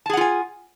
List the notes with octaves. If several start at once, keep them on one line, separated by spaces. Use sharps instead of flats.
F4 G#4 F#5 G#5 A5